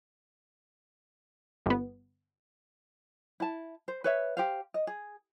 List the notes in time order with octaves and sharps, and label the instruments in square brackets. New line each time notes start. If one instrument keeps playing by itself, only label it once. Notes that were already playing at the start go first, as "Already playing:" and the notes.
[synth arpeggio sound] G1 B3
[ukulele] E4 A5
C5
B4 C#5 E5
G4 C5 F5
D#5
G#4